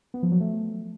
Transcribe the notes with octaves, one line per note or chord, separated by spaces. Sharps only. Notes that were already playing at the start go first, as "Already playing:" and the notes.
B3
F3
F#3
A3